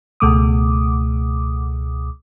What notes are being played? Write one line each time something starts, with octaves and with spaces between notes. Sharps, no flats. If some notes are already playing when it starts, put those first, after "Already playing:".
C#2 B2 A3 D6 D#6